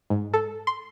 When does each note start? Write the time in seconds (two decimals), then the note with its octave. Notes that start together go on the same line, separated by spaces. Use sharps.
0.10 G#2
0.34 A4
0.67 C6